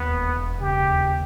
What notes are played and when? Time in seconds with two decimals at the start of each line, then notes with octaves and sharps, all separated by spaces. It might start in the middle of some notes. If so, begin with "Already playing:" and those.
Already playing: D#2 B3
0.10 E1
0.34 E1
0.60 C#3 G4
0.86 D#2